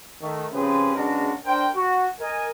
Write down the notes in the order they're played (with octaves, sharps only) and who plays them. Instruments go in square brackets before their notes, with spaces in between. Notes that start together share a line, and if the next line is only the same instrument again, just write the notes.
[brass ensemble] D#3 A3
C#3 F3 C4 G4 G#4 B4
C#3 G#3 B3 D4 F#4 A#4
D4 A#4 C5 G5
F#4
A#4 D#5 G#5